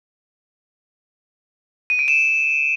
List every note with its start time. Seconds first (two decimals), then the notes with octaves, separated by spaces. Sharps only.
1.90 D#7
1.99 D7
2.08 E7